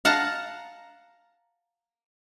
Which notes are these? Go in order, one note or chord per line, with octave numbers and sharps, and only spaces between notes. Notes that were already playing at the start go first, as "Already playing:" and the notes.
F5 F#5 A5 A#5